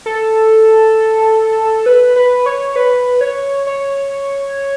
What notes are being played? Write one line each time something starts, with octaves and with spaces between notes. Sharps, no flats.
A4
B4
B4
C#5
B4
C#5
C#5